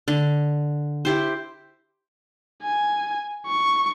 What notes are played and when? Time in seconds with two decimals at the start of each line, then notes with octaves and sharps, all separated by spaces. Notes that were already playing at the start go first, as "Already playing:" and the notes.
0.08 D3
1.05 E4 G4 C5
2.63 G#5
3.47 C#6